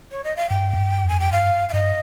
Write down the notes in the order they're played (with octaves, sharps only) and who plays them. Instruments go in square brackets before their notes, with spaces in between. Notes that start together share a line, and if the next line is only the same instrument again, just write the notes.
[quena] C#5
D#5
F5
[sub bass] G2 [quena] G5
[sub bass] F2
G2
[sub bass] F2 [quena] G#5
[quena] G5
[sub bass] G2 [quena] F5
[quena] F5
[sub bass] G2 [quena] D#5